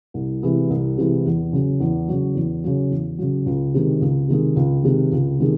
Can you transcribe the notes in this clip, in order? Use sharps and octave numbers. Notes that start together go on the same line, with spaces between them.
C2
C3 E3 G#3
C2
C3 E3 G#3
E2
C#3 F#3
E2
C#3 F#3
E2
C#3 F#3
E2
C#3 F#3
C#2
C3 D#3 G#3
C#2
C3 D#3 G#3
C#2
C3 D#3 G#3
C#2
C3 D#3 G#3